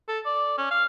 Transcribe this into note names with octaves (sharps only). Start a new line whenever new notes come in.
A4
D5
C#4
F5